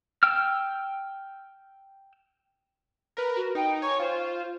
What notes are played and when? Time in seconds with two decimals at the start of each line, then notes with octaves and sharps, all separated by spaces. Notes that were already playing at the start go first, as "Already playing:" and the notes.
0.23 G5 E6 F6
3.17 A#4 B4
3.36 F#4
3.55 D#4 G5
3.82 C#5 G#5 C#6
3.99 F4 C5